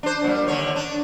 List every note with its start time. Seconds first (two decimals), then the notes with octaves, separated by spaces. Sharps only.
0.03 D4 C5
0.24 A#2 G3
0.48 D#2 D3 C#5
0.76 D4